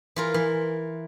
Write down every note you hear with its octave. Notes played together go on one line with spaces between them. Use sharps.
E3 F4 A#4
E3